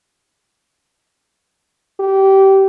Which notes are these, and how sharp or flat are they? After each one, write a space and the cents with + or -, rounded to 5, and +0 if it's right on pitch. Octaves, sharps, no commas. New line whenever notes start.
G4 -20